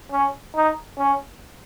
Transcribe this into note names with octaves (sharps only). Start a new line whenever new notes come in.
C#4
D#4
C#4